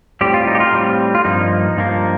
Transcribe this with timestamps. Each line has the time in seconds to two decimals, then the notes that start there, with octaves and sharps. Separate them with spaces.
0.21 A2 G3 C4 G4
0.34 F4
0.47 D#4
0.55 G4
0.60 F4
0.73 A2 G3 C4
1.15 F4
1.25 G2 F3 A#3 D#4
1.77 G2 F3 A#3